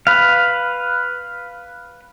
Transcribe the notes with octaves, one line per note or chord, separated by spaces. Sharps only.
B4 F5